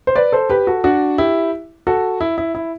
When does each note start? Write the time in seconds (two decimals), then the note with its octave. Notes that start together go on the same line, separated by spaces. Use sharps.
0.07 C5
0.16 B4 D5
0.32 A4 C5
0.50 G4 B4
0.67 F#4 A4
0.84 D4 F#4
1.18 E4 G4
1.87 F#4 A4
2.21 E4
2.38 E4
2.55 E4